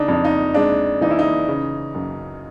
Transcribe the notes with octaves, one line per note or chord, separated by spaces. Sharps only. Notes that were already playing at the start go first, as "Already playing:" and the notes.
Already playing: C#3 D4 D#4
F2
D#4
G#3 D4
E3 D#4
E4
D#4
C#3
F#2